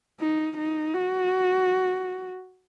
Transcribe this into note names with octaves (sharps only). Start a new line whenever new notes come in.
D#4
D#4
F#4